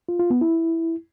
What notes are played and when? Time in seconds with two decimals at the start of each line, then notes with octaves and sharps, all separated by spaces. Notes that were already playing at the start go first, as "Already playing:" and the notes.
0.09 F4
0.19 F4
0.30 B3
0.41 E4